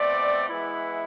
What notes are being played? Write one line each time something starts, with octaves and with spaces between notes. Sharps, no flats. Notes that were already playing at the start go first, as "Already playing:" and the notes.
Already playing: B2 A3 C4 D5
E3 G#3 B3 E4